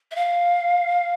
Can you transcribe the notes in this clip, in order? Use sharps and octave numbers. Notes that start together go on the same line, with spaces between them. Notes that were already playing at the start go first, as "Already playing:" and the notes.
E5
F5